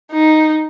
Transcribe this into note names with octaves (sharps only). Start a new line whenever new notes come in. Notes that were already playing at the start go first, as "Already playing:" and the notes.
D#4